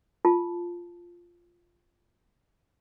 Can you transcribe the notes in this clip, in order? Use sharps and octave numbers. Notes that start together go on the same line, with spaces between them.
F4 A5